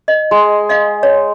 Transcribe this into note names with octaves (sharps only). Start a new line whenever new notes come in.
D#5
G#3
D#5 F5
C#5